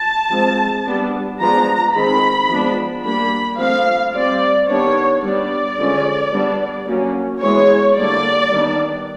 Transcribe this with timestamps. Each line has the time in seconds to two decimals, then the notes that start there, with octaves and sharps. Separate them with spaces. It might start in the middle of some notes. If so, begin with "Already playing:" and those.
Already playing: A5
0.31 F3 G#3 C4
0.86 G3 B3 D4
1.40 F3 G#3 B3 D4 A#5
1.94 D#3 G#3 C4 B5
2.49 F3 G#3 B3 D4
3.04 G3 A#3 D4 B5
3.59 F3 A3 C4 F5
4.13 G3 C4 D5
4.69 D#3 G3 B3 D4 C#5
5.23 G3 B3 D4 D5
5.78 D3 F3 G#3 C#4
6.33 G3 B3 D4
6.87 F#3 A#3 C#4
7.41 E3 G#3 B3 C#5
7.96 D3 G3 A#3 D5
8.51 D#3 G3 B3 D4